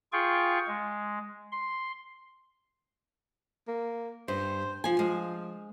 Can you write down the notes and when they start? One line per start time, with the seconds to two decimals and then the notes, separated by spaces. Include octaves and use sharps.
0.13 F4 G#4 G5 C#6
0.67 G#3
1.52 C6
3.68 A#3
4.28 G2 C5
4.84 F3 G#5
4.99 F3 G#3